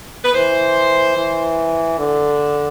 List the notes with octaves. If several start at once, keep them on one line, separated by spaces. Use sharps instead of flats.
B4
E3 C5
E3
D3